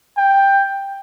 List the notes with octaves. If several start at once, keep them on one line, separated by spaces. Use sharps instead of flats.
G5